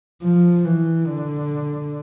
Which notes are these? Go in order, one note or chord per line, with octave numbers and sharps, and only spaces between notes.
F3
E3
D3